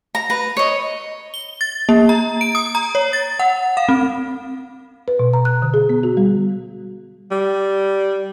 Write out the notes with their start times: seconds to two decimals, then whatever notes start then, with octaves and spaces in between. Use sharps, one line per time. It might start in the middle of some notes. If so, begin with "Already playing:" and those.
0.15 A#5
0.30 B4 A#5
0.57 C#5 D#5
1.34 G7
1.61 A6
1.89 A#3
2.09 A#5
2.41 D7
2.55 D#6
2.75 A#5
2.95 C#5
3.13 A6
3.39 F#5
3.77 F5
3.89 C4
5.08 B4
5.19 B2
5.34 A#5
5.45 F#6
5.62 D3
5.74 G#4
5.89 B3
6.03 F#4
6.17 G3
7.31 G3